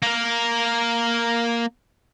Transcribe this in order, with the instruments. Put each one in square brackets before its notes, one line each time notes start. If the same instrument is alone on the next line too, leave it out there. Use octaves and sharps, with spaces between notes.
[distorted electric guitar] A#3 A#4